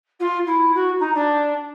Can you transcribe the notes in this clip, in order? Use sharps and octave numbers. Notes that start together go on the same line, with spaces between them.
F4
E4
F#4
D#4
D4